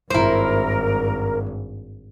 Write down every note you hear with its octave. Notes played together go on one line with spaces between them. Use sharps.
G#1 G2 E4 A#4 C5